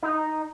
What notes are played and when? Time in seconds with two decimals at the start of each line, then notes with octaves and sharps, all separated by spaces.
0.03 D#4